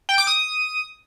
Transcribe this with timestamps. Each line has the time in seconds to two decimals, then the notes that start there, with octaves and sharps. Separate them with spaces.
0.09 G5
0.18 D6
0.27 D#6